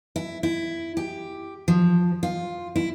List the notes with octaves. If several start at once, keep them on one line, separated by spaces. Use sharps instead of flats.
E4
E4
G4
F3
F4
E4